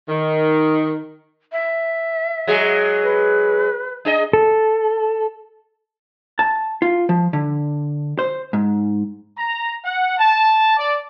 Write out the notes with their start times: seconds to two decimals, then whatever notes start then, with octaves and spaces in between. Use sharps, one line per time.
0.09 D#3
1.52 E5
2.47 F#3 G#3 G#4
3.04 B4
4.05 D4 G#4 D#5
4.33 A4
6.39 A5
6.82 F4
7.09 F3
7.33 D3
8.19 C5
8.53 G#2
9.37 A#5
9.85 F#5
10.18 A5
10.77 D5